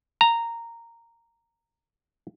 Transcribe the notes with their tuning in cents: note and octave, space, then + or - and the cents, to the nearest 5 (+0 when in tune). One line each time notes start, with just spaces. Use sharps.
A#5 -10